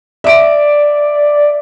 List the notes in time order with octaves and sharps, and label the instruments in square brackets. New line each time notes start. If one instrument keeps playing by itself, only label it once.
[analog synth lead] D5 [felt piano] E5 D7